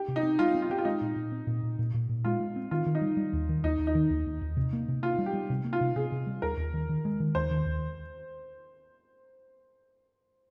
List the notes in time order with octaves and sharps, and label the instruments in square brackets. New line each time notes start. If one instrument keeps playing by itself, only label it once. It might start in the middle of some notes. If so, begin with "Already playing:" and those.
Already playing: [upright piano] G4
[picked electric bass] C3
[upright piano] D#4
[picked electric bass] C4
[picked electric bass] G3 [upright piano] F4
[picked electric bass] C4
[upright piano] F4
[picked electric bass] C4 [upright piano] G4
[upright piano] F4
[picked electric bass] G#3 [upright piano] D#4
[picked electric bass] A#2
A#2
C4
A#2
A#2
A#2
A#2
A#2
[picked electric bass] G#3 [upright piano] F4
[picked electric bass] G#3
C4
[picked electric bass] D#3 [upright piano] F4
[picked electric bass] D#3
[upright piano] D#4
[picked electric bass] G3
G3
D#2
D#3
[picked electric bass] D#2 [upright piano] D#4
[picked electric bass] D#2
[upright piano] D#4
[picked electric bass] D#3
D#2
D#2
D#2
C3
A#3
C3
[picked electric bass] A#3 [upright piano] F4
[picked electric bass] G3
[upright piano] G4
[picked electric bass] G3
C3
A#3
[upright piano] F4
[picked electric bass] C3
[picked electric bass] C3 [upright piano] G#4
[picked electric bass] C3
G3
[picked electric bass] D#2 [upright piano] A#4
[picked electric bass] D#2
D#3
D#3
G#3
D#3
[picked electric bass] D#2 [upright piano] C5
[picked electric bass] D#3
D#2